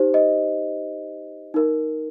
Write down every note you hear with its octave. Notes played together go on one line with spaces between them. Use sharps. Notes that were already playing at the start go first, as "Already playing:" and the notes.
Already playing: D#4 G4 C5
D#5
D#4 A#4